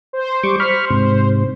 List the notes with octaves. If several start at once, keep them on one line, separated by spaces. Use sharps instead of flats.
C5
G3 C#6 D6
B5 C#6 F6
G#2 C3